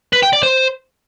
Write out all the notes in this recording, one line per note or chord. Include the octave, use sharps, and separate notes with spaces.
B4
G5
D5
C5